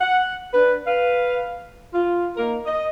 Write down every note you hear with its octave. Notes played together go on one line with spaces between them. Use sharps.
F#5
D4 B4
B4 F5
F4
A#3 D#4 A#4
D#5